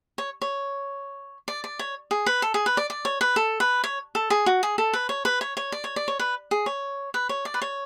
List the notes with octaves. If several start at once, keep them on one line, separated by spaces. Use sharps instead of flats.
C#5
C#5
D5
D5
C#5
G#4
B4
A4
G#4
B4
D5
D5
C#5
B4
A4
B4
C#5
A4
G#4
F#4
G#4
A4
B4
C#5
B4
C#5
C#5
D5
C#5
D5
C#5
B4
G#4
C#5
B4
C#5
D5
B4
C#5